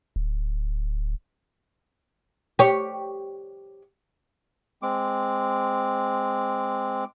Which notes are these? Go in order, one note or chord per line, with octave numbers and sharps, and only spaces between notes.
D1
G4 C#5
G#3 C4 D6